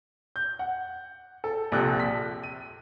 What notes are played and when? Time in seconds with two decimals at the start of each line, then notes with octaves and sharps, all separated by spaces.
0.36 G6
0.59 F#5
1.44 A4
1.72 A#1 C3 F3 A4 F#6
2.00 B6
2.43 D#7